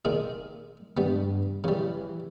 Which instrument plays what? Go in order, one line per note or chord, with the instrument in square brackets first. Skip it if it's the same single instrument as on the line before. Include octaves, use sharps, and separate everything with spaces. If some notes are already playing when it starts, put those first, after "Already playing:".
[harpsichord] A#2 D#3 G#4
[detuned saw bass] G2 [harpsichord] G3 B3
[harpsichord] C#3 G3 [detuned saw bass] E3